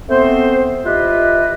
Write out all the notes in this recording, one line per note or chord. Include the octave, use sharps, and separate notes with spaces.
A3 B3 C4 C5
E4 F4 G4 B4 D#5